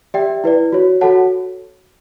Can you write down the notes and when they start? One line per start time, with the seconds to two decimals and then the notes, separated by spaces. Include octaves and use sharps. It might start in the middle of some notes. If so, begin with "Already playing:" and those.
0.14 G4 D5 E5 G5
0.44 E4 B4 D5
0.72 F#4 C#5
1.01 F#4 A4 C#5 F#5 A5